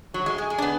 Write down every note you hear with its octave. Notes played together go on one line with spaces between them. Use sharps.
F#3 F#4
G#3
G#3 G#4
G#3
D4
B3